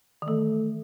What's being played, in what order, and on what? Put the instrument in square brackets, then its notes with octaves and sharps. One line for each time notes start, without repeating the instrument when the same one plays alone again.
[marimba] D#3
[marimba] E3 [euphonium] A3